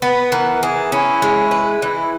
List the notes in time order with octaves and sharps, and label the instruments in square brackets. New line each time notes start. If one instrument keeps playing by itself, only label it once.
[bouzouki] B3 [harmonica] B4
[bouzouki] E3 [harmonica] A#4
[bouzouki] E3 [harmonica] G#4
[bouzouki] C#4 [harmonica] E4
[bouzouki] G#3
B4
[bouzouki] E3 [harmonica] E4